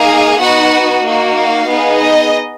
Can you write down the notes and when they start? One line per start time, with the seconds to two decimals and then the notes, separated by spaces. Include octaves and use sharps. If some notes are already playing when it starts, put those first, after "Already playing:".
Already playing: A#3 D#4 G#4 F5
0.39 B3 D#4 F#4 F#5
1.04 A#3 D#4 F#4
1.36 F5
1.67 B3 D#4 G#4
2.00 D#5